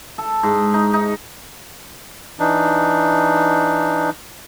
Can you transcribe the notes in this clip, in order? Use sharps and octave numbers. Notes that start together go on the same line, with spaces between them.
A4
G#2
D#4
D#4
E3 D4 D#4